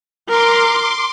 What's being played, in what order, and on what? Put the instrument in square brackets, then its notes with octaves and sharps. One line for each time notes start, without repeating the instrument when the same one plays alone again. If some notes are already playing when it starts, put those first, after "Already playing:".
[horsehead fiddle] A#4 [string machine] C6 D6